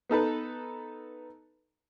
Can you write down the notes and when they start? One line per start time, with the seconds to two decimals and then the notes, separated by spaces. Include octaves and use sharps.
0.10 B3 D#4 A4 B4